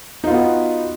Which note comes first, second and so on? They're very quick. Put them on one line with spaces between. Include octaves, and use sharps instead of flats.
D#4 F4 B3 F#4